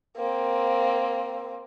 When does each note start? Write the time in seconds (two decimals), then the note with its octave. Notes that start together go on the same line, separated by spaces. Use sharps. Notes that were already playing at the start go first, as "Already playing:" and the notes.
0.17 A#3 C4